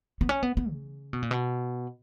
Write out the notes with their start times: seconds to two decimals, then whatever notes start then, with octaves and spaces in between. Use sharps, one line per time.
0.21 B3
0.29 C#4
0.43 B3
0.57 B3
0.71 C#3
1.13 B2
1.22 A#2
1.31 B2